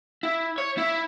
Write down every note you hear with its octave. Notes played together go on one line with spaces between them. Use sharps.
E4
C#5
E4